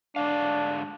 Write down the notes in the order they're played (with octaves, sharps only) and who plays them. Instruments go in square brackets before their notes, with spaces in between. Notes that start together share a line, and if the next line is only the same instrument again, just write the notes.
[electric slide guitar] G#2 D3 F5 [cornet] D4